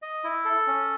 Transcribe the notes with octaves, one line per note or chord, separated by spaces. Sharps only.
D#5
E4
A4
C#4